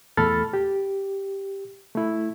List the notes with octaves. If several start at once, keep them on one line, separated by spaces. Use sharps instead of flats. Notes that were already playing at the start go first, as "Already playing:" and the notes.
E2 A3 A4 B5 F6 A6
G4
A3 E4